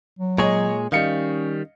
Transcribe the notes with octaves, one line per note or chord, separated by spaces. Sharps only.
F#3
A#2 G#3 G#4 C#5 D#5
D#3 G3 C#4 D#5 F5 C#7